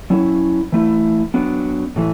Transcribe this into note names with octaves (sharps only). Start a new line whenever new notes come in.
F#3 C#4 E4
E3 A3 E4
F#3 B3 D4
A2 E3 A3